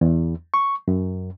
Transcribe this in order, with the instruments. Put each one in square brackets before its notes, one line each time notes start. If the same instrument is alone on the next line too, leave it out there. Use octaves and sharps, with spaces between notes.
[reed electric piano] E2
C#6
F#2